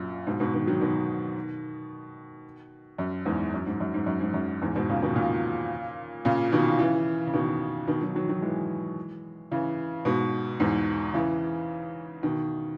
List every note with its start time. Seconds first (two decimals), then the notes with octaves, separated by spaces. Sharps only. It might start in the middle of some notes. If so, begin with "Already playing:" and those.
Already playing: F#2 A#2
0.27 G#2 B2
0.40 G#2 B2
0.54 B2 D#3
0.67 D#3 F#3
0.81 B2 D#3
2.98 F#2
3.25 E2 G#2
3.54 F#2
3.66 G#2
3.80 F#2
3.94 G#2
4.06 F#2
4.21 G#2
4.34 F#2
4.62 E2 G#2
4.76 G#2 B2
4.89 A#2 C#3
5.02 B2 D#3
5.16 A#2 C#3
6.25 A#2 C#3
6.52 B2 D#3
6.79 C#3 E3
7.27 C#3
7.34 B2 D#3
7.87 B2 D#3
8.01 D#3 F#3
8.15 D#3 F#3
8.29 D#3 F#3
8.42 E3 G#3
9.51 C#3 E3
10.05 G#2 B2
10.60 E2 G#2
11.14 C#3 E3
12.23 B2 D#3